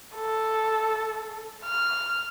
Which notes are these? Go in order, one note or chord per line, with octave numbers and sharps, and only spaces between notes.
A4
F6